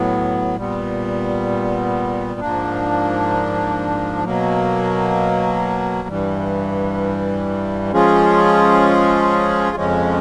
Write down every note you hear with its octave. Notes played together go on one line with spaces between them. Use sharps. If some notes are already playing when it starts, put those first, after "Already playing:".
Already playing: A2 F#3 B3
A#2 G3 B3
G#2 F3 A#3 D4
B2 F#3 A#3
G2 E3 G3
F3 G#3 C#4 F4 G#4
F2 C#3 F3 G#3 C#4